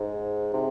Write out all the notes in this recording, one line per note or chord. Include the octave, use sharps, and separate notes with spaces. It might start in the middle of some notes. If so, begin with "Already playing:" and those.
Already playing: G#2
C3